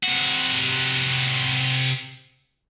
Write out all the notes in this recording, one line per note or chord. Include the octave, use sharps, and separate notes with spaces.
C3 F#4